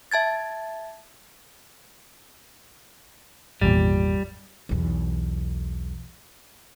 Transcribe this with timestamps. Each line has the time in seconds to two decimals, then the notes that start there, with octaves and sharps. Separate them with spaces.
0.11 E5 A5 G#6 A6
3.61 G#1 E2 A#2 G3
4.69 B1 E2